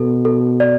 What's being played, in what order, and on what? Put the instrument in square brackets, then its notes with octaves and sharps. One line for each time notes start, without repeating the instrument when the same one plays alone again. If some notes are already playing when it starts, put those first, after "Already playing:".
Already playing: [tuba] B2 [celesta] A4
[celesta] A4
D5